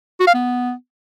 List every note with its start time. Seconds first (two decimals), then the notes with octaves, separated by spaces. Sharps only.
0.20 F#4
0.27 F5
0.34 B3